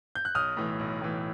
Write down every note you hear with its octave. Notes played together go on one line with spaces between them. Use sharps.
G6
F#6
B1 D#6 F6
A2 E3
B1
A2 E3